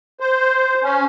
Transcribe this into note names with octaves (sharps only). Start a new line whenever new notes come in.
C5
C#4